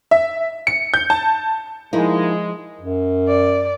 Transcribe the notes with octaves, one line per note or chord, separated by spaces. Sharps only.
E5
C#7
G6
A5
F3 G#3 A#3 D#4 E4
F#2
D5